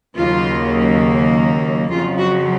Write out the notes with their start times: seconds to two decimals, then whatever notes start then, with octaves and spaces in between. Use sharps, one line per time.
0.15 D#2 C#3 F#3 A#3 F4
1.90 F2 C#3 F#3 F4
2.19 F#4